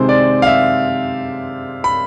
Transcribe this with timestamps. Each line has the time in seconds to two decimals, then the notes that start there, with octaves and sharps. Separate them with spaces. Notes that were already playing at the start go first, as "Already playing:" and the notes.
Already playing: C3 D#3 G#3 C4 C5
0.09 D5
0.42 F5
0.47 E5
1.84 B5